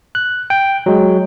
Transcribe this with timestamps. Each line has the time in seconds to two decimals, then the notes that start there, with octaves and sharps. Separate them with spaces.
0.15 F#6
0.50 G5
0.86 F#3 G#3